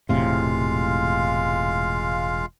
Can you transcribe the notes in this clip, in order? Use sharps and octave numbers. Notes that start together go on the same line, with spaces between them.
E1 A2 C3 G#3 F4 F5